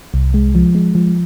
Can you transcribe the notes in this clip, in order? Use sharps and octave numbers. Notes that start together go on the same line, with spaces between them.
C2
G#3
F3
G#3
F3